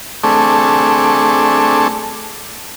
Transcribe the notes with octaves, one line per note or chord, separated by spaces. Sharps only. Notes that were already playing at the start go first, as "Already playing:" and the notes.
A3 C4 D4 G#4 A4 C#6